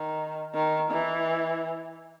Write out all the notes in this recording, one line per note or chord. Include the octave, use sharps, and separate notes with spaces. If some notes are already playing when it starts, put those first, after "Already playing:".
Already playing: D#3
D#3
E3